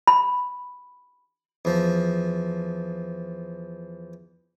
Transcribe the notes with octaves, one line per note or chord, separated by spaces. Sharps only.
B5
E2 F3